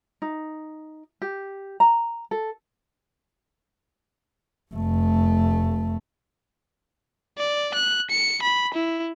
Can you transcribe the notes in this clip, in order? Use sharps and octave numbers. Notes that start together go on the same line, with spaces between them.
D#4
G4
A#5
A4
F1 A3
D5
F#6
C#7
B5
E4